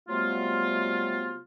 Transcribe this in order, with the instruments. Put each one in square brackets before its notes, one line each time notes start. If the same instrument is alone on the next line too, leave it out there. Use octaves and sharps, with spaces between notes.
[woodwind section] C3 F#3 G3 A3 B3 F4